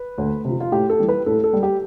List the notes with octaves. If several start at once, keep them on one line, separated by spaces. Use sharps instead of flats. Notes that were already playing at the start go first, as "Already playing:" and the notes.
Already playing: B4
D2
C3 F3
F4
A2 G4
A4
E3 G3
B4
A2 A4
A4
G3
G4